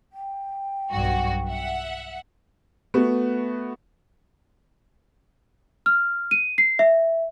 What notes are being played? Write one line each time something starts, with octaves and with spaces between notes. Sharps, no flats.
G5
B1 G2 F#4
E5 F#5
A3 B3 F#4
F6
D#7
C7
E5